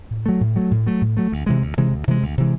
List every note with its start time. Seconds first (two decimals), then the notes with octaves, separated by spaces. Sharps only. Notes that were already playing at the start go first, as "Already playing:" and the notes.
0.11 A2
0.26 F#3 A3
0.41 A2
0.56 F#3 A3
0.71 A2
0.87 F#3 A3
1.01 A2
1.17 F#3 A3
1.32 D2
1.46 C3 E3 G#3
1.62 D2
1.77 C3 E3 G#3
1.93 D2
2.07 C3 E3 G#3
2.22 D2
2.38 C3 E3 G#3